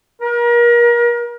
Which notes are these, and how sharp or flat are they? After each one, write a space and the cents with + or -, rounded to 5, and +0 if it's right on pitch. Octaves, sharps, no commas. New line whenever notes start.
A#4 +35